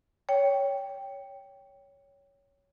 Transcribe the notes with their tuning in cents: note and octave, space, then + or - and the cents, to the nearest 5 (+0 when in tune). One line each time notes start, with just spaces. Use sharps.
C#5 +10 G5 +0